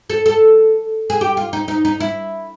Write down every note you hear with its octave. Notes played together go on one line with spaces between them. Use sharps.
A4
A4
G#4
G4
F4
D#4
D#4
D#4
E4